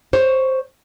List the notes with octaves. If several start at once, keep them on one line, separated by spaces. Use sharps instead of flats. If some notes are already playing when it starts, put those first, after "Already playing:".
C5 C#5